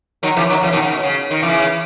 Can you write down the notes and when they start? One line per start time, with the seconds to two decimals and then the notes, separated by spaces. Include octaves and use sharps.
0.23 D#3 F#3
0.36 C#3 E3
0.50 D#3 F#3
0.63 C#3 E3
0.73 B2 D#3
0.83 C#3
0.93 B2
1.03 C#3
1.31 D#3
1.42 C#3 E3